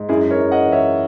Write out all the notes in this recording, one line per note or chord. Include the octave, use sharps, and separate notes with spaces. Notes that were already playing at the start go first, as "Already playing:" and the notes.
Already playing: G#2
F#2 E4 G#4
A#4 C#5
F#2
D#5 F#5
E3
C#5 E5